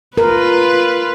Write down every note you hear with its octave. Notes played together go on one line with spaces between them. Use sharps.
F4 A#4 B4